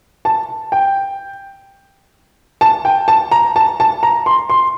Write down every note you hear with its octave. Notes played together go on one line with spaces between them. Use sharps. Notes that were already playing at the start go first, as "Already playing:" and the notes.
A5
G5
A5
G5
A5
A#5
A5
A5
A#5
C6
C6